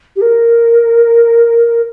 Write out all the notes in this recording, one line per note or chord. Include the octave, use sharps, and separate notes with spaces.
G4
A#4